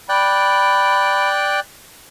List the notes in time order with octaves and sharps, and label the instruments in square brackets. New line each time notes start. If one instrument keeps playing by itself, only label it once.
[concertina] D5 G5 F#6 [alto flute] B5